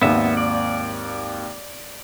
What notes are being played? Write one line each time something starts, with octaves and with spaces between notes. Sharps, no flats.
G#1 D#2 B3 E5
D5